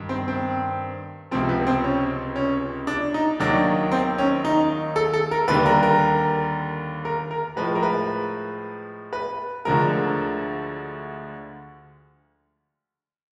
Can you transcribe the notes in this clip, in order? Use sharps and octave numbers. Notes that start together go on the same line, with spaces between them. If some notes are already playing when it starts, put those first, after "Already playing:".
Already playing: G2 D#3
C4
C4
C#2 C3 F3 C4
B3
C4
C#4
C#4
D4
D#4
D#2 D#3 F#3 D4
C4
C#4
D#4
A4
A4
A#4
D#2 D3 G3 B4
A#4
A#4
A#4
A#4
A2 F3 G#3 B4
A#4
B4
B4
D2 D3 F3 G#3 A#4